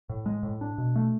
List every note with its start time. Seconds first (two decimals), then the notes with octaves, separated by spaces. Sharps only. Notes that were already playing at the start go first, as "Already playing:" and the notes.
0.09 A2
0.26 G#3
0.43 A2
0.61 D4
0.78 B2
0.96 A3